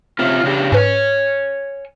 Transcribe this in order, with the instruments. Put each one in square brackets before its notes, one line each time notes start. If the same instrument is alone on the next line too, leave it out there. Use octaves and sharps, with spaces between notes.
[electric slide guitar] C3 C#4 F4
C#3 D4 G4
[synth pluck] G#2 B4 [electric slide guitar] C#5 G#5